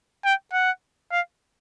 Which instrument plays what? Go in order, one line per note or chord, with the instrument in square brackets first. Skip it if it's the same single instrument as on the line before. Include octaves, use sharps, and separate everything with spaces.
[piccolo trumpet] G5
F#5
F5